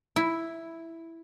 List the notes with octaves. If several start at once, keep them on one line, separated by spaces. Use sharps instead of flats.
E4